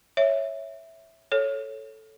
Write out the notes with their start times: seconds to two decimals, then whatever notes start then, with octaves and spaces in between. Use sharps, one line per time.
0.17 C#5 E5
1.32 A4 C#5